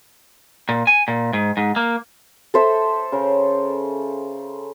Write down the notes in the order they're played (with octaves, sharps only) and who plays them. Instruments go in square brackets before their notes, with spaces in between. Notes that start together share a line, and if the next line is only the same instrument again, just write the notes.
[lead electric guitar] A#2
G#5
A#2
G#2
G#2
A#3
[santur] A4 C5 E5
[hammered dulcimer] C#3 A#4